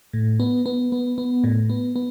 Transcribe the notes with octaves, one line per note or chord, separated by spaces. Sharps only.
A2
B3
B3
B3
B3
A2
B3
B3